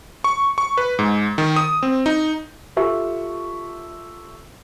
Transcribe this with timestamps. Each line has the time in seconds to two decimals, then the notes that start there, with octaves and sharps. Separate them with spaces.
0.24 C#6
0.58 C#6
0.78 B4
0.99 G#2
1.38 D#3
1.56 D#6
1.83 C4
2.06 D#4
2.76 F4 G4 A4 E5 C#6